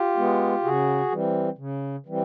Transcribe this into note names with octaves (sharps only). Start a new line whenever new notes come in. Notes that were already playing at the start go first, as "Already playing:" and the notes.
Already playing: F4 G4
G#3 B3
C#3 F#4 G#4
E3 G3 C4
C#3
E3 G3 C4